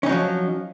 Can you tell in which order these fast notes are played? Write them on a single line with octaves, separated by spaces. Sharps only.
C#4 D#4 F#3 F3